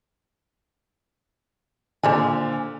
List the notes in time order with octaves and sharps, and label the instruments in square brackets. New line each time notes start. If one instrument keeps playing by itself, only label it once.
[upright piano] A#2 D3 [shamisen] C5 D5 G#5